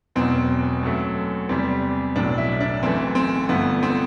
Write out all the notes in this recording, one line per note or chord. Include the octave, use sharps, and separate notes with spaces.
E1 E2 B2 F#3 C4
F#2 F#3 A3
E2 C3 G3 C4
B1 A2 F#3 D4
E4
D4
F#1 F#2 E3 A3 C4
C4
G1 G2 D3 A3 B3
C4